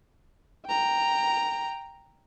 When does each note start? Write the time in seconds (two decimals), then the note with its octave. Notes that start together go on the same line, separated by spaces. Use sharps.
0.66 G5 A#5